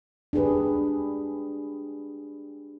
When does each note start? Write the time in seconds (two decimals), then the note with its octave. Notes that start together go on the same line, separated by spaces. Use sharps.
0.33 D4 G4 G#4 B4